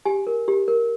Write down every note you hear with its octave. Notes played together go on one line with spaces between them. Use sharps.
G4 G#5
A#4
G4
A#4